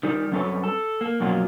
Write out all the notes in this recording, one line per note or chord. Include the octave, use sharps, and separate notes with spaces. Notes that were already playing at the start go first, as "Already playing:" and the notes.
D#3 G3
F#2 G3 C4 A4 B4 C#5
A4
A#3
F#2 B2 F3 F#3 A#3 F4